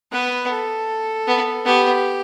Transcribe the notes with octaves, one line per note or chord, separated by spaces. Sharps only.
B3 B4
A4
B3
B3 G4